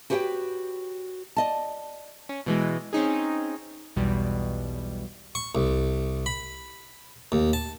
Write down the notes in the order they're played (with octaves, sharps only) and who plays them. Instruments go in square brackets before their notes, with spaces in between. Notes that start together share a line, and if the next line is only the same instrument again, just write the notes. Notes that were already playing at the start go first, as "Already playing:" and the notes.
[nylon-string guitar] F#4 G4 B4 C#5 F#5 G5
D5 D#5 A5
[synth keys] C#4
B2 E3 G#3
C4 C#4 D#4 G#4
B1 E2 B2 G3
[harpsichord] C#6
C2
B5
D#2
A5